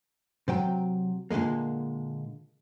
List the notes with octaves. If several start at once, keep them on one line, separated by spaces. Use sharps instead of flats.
C3 F#3 G5
A#2 D3 E3 G#3 A#3